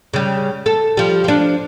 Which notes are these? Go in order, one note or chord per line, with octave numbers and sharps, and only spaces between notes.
C#3 G3
A4
F3 G3
F3 D4